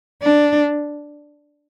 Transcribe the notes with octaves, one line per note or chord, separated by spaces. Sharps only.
D4